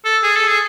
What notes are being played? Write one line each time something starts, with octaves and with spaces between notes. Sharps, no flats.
A4
G#4
A4
G#4